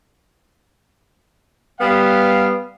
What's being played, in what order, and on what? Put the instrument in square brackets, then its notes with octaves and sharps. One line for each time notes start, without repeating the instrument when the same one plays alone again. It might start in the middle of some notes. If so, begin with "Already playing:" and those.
[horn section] G3 B3 F5